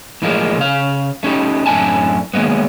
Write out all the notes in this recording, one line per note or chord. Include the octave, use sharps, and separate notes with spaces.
A2 E3 F3 G#3 A#3
C#3 F5
A3 C#4 D#4 G4
F#2 A2 C4 D4 G#5 A5
D#3 F#3 G#3 A#3 B3